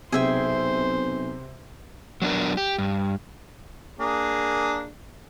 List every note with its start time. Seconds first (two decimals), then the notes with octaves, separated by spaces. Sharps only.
0.12 B1 C3 G#4 C5 E5 G5
2.22 F#3 B3 D4 A#4
2.57 G4
2.79 G2
3.99 A#3 D4 G#4